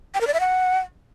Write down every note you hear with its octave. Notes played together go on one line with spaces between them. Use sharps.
G5
A#4
D5
E5
F#5